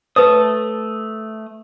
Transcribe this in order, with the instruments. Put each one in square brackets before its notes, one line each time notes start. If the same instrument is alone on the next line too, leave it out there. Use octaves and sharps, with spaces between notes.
[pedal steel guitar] A3 A5 D#6 [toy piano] B4 C#5